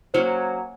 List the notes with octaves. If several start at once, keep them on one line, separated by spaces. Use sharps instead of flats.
F#3 A#3 C#4 F#4 C5